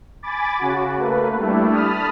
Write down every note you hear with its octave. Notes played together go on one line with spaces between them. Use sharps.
G#5 B5 D6 A6
C#3 F#4
A3 A#3 B4
G3 A3 D4 E4
A5 B5 D#6 F6